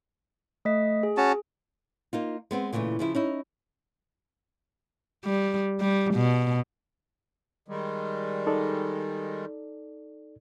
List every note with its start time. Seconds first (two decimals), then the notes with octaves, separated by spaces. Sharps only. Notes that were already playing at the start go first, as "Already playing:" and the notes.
0.65 A3 D#5 B6
1.03 G#4
1.17 C#4 F#4 A5
2.13 A#3 D#4 F4
2.51 G#3 B3 C4
2.73 A#2 C#3 E3 G3 A3
2.99 C#3 F3 E4
3.15 C#4 D#4 E4
5.25 G3
5.80 G3
6.15 B2
7.68 D#3 G3 G#3
8.47 D#4 A4 D5